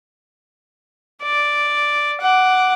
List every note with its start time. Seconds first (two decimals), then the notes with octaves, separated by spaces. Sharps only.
1.23 D5
2.21 F#5 D6